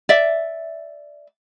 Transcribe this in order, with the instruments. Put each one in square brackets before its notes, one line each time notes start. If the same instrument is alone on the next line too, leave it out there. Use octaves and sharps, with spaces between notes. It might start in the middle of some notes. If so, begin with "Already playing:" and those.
[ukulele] D5 E5